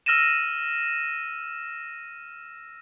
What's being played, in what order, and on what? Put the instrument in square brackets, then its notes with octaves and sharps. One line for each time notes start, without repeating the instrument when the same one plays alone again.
[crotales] E6 F6 A#6 D#7 E7